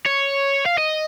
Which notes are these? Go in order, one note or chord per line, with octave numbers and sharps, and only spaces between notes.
C#5
F5
D#5